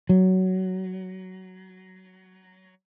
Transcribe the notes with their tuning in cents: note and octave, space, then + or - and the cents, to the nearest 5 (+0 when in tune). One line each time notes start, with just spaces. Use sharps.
F#3 +15